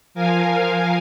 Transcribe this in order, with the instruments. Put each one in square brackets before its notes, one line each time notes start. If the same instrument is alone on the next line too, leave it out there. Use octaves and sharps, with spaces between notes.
[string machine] F3 A#4 F5 G#5